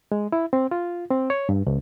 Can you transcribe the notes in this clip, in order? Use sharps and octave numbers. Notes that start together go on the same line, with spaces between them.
G#3
E4
C4
F4
C4
C#5
G2
C#2